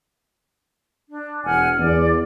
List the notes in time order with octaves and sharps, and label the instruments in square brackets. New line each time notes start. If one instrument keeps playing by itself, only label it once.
[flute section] D4
[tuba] E1 [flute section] F#5 G#5 F6
[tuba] E2 [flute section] D5